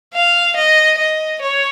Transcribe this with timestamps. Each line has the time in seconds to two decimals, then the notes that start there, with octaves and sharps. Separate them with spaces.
0.14 F5
0.55 D#5
0.98 D#5
1.41 C#5